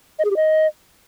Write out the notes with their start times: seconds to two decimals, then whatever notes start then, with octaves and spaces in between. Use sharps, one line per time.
0.19 D#5
0.25 G#4
0.30 G4
0.36 D#5